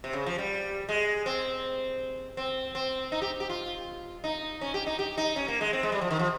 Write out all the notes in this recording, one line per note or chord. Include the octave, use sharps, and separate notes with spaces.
C3
C#3
F3
G3
G#3
C4
C4
C4
D#4
G4
G4
F4
D#4
C#4
G4
D#4
G4
D#4
C#4
A#3
G#3
C4
G#3
G3
F3
D#3
F3